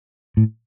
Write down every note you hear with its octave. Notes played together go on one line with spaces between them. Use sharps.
A2